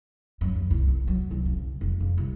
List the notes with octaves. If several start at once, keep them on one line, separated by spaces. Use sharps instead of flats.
F#2
D#2
C2
A3
F#3
C2
C#3
F1
C#3
C2